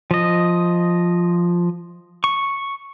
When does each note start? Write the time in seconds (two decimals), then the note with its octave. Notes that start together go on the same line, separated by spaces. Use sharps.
0.11 F3 D#5
2.24 C#6